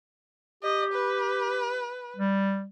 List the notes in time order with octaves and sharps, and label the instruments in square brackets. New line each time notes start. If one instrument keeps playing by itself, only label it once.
[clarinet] G4 [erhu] D#5
[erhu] B4
[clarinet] G3